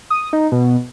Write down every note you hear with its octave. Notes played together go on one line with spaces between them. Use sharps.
D#6
D#4
B2